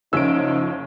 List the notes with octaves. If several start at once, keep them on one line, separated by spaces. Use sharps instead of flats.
F#1 F3 C#4 D#4 E6 D7